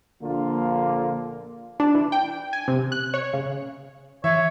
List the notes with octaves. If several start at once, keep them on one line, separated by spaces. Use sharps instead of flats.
A#1 D3 A#3 F4
D4
E3
G5
G#5
C3
F#6
C#5
C#3
E3 C#5 E5